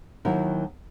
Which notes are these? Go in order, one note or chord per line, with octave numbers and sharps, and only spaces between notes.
D#2 D#3 F#3 E4 F#4 A#4